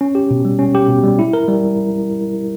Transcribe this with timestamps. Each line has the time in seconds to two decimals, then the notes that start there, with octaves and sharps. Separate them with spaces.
0.01 C#4
0.15 G4
0.31 B2
0.45 G3
0.59 C#4
0.75 G4
0.88 B2
1.03 G3
1.19 E4
1.33 A#4
1.48 G3